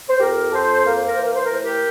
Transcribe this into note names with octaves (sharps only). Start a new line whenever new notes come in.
C5
F2 G4 A#4
F2 A4 C5
A#3 A#4
C5
A#4
E3 C5
A#4
C5
A#4
A2 C5
G4 A#4